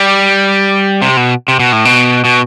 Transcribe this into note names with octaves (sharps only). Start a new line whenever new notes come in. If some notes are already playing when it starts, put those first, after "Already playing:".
Already playing: G3
C3
B2
C3
B2
A2
B2
B2